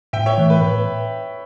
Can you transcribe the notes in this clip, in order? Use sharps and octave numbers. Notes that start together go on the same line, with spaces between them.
A2 E5 G5
C#5 E5
E3 A3
B4
A2 B4